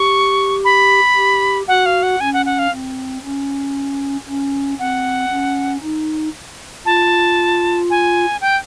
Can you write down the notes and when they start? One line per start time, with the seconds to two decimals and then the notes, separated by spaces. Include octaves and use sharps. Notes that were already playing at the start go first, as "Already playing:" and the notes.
Already playing: G4 C#6
0.65 B5
1.16 G4
1.68 F#4 F#5
1.86 F5
2.03 F#5
2.20 C#4 G#5
2.33 F#5
2.46 F#5
2.59 F5
2.72 C4
3.24 C#4
4.27 C#4
4.79 C4 F#5
5.30 C#4
5.82 D#4
6.86 F4 A5
7.90 G#5
8.41 G5